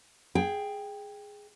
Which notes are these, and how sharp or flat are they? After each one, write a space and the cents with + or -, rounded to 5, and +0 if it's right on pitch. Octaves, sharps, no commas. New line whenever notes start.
G#4 +0 G5 +15